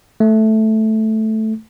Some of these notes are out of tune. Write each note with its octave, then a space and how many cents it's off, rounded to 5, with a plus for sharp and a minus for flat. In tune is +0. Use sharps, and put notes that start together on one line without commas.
A3 -5